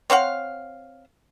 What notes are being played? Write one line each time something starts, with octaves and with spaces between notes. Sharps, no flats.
C4 C#5 F5 F#5